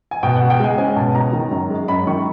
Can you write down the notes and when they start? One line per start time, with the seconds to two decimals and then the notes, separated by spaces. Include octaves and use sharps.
0.11 G#5
0.23 B2 G5
0.36 F#5
0.41 C#2
0.50 G5
0.59 G#3 G#5
0.78 C#4 G#5
0.96 B2 A5
1.15 C#2 A#5
1.33 D#3
1.51 F#2
1.70 G#3
1.88 F#2 B5
2.07 D#3 C#6